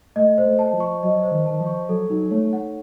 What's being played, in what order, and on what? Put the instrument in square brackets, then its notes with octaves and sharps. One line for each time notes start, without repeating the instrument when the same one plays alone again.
[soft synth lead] A3 [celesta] D#5
[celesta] C5
[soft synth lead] A3
[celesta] A5
[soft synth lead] F3
[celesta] C#6
[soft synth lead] F#3 [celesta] D#5
[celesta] C5
[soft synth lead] D#3
[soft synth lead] D#3 [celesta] A5
[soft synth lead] F3
[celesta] C#6
[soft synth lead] F#3 [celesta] A4
[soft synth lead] F#3 [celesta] D#4
[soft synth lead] A3 [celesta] C#5
[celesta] F#5